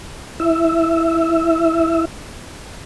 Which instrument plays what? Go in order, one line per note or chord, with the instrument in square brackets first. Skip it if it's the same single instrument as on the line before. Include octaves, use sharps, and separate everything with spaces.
[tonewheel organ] E4 E5